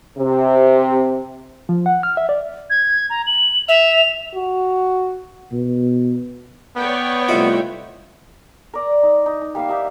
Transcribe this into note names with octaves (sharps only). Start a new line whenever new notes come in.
C3
F3
F#5
F6
E5
D5
G#6
A#5
F#7
E5 F7
F#4
B2
B3 C#5 D5 G5
C2 A2 F4 F#4 D#5 E5
A#4 D5 A#5
D#4
D#4
D#4
G3 A#3 E5 F5
A#3 D#4 G4 E5